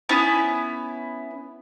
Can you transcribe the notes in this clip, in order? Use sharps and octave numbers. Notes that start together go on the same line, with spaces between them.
B3 C#4 E4